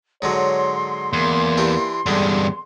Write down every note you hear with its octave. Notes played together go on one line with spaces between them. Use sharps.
G#2 D3 F#3 C#5 C6
E2 A#3
E3 D4 G4
E2 G2 D3 G3 G#3